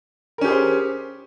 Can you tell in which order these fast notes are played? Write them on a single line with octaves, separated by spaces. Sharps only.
A#4 C#4 G4 G#4 C5